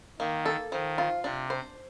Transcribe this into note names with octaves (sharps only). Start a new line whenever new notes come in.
D#3 A#3
A4
D#3 F3
F4
C3 D4
C5